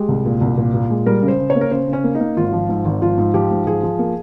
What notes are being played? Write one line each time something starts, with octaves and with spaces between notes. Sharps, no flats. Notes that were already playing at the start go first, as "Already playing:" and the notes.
Already playing: G#3 G4
C2
A#2
C2
A#2
A#2
G#3
G3 A#4
C#3
C5
C#3
C#5
A#3
A#4
C#3 C5
C#3
C#4
A#3
D#4
A#3
G#1 F4
F3
G#2
G#1
F3 F4
G#2
F3 G4
G#2
F3 G#4
F3
A#3